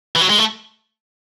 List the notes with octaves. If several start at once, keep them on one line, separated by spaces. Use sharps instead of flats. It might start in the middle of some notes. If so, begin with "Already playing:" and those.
E3
F#3
G#3
A3